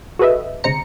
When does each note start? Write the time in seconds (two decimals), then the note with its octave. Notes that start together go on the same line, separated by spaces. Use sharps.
0.19 F#4 G#4 A4 B4 D#5 E5
0.64 D2 C3 G#3 C5 A#5 C#7